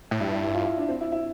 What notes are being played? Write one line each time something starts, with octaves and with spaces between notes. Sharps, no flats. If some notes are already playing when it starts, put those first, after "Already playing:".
A2
G2 E4
E4
E4
F4
E4
D4
C4
E4
E4